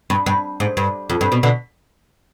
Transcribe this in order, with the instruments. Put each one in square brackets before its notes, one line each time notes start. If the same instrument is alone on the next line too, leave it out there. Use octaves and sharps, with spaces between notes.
[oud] G2
G2
G#2
G2
F2
G2
B2
B2 D3